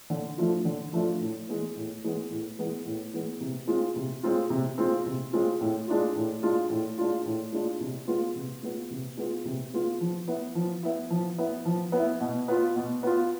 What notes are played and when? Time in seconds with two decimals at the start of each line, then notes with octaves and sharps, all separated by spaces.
0.10 D3
0.38 F3 A3 D4 F4
0.65 D3
0.93 F3 A3 D4 F4
1.20 A2
1.48 E3 G#3 B3
1.76 A2
2.03 E3 G#3 B3
2.30 A2
2.58 E3 G#3 B3
2.86 A2
3.13 E3 G#3 B3
3.40 C3
3.67 G#3 C4 F4
3.96 C3
4.23 G#3 C4 F4
4.50 C3
4.78 G#3 C4 F4
5.06 C3
5.33 G#3 C4 F4
5.61 A2
5.87 G#3 D4 F4
6.15 A2
6.43 G#3 D4 F4
6.70 A2
6.98 G#3 D4 F4
7.25 A2
7.53 G#3 D4 F4
7.80 C3
8.07 G#3 B3 F4
8.35 C3
8.63 G#3 B3 F4
8.90 C3
9.17 G#3 B3 F4
9.45 C3
9.73 G#3 B3 F4
10.01 F3
10.28 B3 E4
10.55 F3
10.83 B3 E4
11.10 F3
11.38 B3 E4
11.65 F3
11.92 B3 E4
12.21 B2
12.48 B3 F4
12.76 B2
13.03 B3 F4